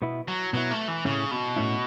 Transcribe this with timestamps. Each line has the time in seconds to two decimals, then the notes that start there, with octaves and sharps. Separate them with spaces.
0.02 B2 B3 E4
0.28 F#3
0.53 B2 F#3 B3 E4
0.71 A3
0.88 E3
1.05 A2 C#3 A3 C#4 E4
1.31 B2
1.56 A2 A3 C#4 E4